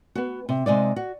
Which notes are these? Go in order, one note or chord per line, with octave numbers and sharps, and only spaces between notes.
B3 F#4
C3
C3 G#3 D#4 D5
F#4